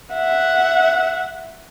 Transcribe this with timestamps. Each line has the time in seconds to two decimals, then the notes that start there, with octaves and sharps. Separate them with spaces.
0.14 E5 F#5